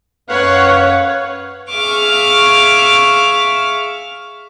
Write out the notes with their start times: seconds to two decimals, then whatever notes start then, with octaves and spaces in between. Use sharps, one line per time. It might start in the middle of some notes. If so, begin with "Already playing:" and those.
0.30 F#2 B4 C#5 F5 F#5
1.71 G#4 E5 F5 C#6 D6 F6